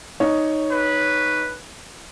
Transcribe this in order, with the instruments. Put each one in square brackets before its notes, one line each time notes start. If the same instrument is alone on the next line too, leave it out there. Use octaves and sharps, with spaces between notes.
[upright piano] D#4 C#5
[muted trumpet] B4